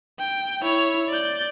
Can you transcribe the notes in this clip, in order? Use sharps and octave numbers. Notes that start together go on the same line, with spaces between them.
G5
E4 C#5
D5 G6